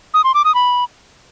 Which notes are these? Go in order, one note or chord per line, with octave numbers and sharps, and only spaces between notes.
D#6
C6
D6
D#6
B5